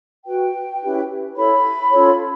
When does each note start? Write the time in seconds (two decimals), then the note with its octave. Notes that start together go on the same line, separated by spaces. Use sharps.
0.25 F#4 B4 G5
0.81 C#4 E4 G4 B4
1.36 E4 A4 C#5 B5
1.91 C#4 F4 A4 C#5